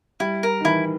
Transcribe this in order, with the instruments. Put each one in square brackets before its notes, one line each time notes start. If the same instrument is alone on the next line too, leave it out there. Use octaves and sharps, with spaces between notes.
[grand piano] G3 [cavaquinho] E4
[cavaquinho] A#4
[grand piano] D#3
[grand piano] E3 [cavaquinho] E4